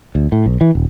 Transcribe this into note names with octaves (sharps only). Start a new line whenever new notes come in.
D2
A2
B1
E3
D#1